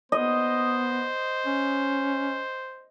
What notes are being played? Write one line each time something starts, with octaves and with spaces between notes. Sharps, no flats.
B3 C5 D#5
C#4